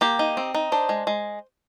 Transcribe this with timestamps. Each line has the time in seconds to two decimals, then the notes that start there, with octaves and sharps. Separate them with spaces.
0.01 A#3 G4
0.19 D#4
0.37 C4
0.54 D#4
0.72 D4 C5
0.89 G#3
1.07 G#3